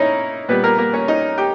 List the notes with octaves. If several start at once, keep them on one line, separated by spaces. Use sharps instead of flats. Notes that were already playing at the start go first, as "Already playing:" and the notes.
Already playing: A#3 C#4 D#4 E4 C#5 D#5
A#2 G3 B3 B4
A#3 A#4
A#3 A#4
C#4 C#5
D#4 D#5
G4 G5